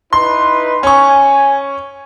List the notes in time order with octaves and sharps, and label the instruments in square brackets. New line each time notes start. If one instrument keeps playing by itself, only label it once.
[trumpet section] D#4 E4 B4 [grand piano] C6
[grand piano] C#4 C#6 [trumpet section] G#5